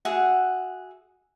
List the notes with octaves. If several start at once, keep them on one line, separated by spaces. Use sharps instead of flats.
F#4 G#4 E5 F#5